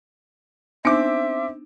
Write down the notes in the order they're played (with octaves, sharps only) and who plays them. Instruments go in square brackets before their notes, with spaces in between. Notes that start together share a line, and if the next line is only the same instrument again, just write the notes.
[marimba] B3 D4 D#4 [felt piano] C4 D6 [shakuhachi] E5